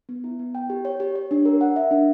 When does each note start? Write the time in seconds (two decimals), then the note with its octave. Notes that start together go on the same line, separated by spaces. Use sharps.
0.09 B3
0.24 E4
0.39 B3
0.55 G5
0.70 G4
0.85 C#5
1.00 G4
1.15 C#5
1.31 D4
1.45 A#4
1.61 F#5
1.76 E5
1.91 D4